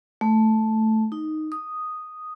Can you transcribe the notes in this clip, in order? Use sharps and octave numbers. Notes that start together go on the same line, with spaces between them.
A3
D#4
D#6